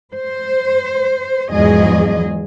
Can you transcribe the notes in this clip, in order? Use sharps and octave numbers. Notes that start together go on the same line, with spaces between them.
C5
E2 G#2 F3 F#3 G#4 D#5